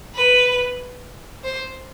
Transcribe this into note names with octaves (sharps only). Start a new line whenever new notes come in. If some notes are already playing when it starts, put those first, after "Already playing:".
B4
C5